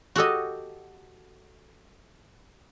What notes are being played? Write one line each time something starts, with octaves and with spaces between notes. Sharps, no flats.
F#4 G4 A4 D#5